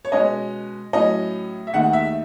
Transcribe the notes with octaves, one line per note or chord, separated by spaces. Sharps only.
C#5
B2 G#3 C#4 D#5
A2 F#3 C#4 D#5
E5
D#2 D#3 A3 F#5
E5